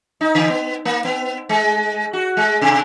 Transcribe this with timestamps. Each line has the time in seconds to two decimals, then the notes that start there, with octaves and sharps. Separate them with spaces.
0.21 D#4
0.35 D3
0.50 B3
0.85 A#3
1.05 B3
1.49 G#3
2.13 F#4
2.37 G#3
2.62 C3